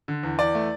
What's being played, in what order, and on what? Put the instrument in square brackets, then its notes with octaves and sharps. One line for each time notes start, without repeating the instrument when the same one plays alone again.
[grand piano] D3
E2
E2 D5
A3